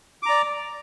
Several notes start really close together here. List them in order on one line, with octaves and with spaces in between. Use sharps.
D6 A#5 D5